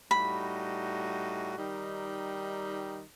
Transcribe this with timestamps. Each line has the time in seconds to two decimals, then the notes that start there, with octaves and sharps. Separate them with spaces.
0.11 A2 G3 D#4 F#4 B5
1.57 D#3 G3 D#4